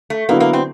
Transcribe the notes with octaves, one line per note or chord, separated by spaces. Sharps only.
A3
D3 F#3 A#3 B3 E4
A#3
C4